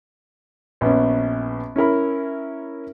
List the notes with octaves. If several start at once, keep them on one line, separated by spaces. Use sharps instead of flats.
A#1 B3 C#4
C#4 E4 A#4 B5